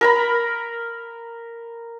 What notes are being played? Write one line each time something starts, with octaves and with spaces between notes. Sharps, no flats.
A#4 A#5 B5